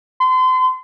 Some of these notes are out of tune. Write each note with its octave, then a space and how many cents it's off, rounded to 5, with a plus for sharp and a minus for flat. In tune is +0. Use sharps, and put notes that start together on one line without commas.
C6 -35